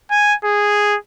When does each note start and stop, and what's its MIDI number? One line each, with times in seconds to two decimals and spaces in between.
0.11 0.34 80
0.44 0.97 68